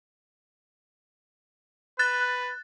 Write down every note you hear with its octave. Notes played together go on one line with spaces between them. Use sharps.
B4 F#6 A6